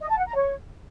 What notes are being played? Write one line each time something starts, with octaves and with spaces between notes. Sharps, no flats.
D#5
A5
F#5
A#5
C#5